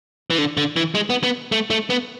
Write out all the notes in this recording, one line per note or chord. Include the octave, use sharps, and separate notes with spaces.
E3
D3
D3
E3
G#3
B3
B3
A3
A3
B3